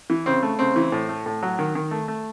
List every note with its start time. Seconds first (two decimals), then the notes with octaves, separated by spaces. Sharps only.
0.10 E3
0.26 C#3 C4
0.42 A3
0.59 C#3 C4
0.76 E3
0.92 A2
1.09 A3
1.26 A2
1.42 F#3
1.59 D#3
1.75 D#3
1.91 A3
2.08 A3